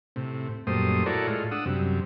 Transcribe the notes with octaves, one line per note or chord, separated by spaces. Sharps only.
A2 C3
F#2 A#2 G3 A3 C5 D#6
E4 F#4 A4 A#4 C#5 D5
A2 G#3 F4
D4 F#5 D#6 E6
F#2 C3 G3